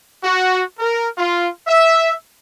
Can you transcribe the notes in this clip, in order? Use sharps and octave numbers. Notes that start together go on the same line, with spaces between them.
F#4
A#4
F4
E5